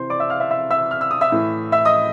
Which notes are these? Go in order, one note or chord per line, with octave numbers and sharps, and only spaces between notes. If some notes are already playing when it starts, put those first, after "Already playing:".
Already playing: C3 E3 C5 C6
D5 D6
E5 E6
F5 F6
E5 E6
E5 E6
E5 E6
F6
E6
D#6
E5 E6
A2 E3
E5 E6
D#5 D#6